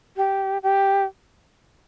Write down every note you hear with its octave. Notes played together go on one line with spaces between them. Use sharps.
G4
G4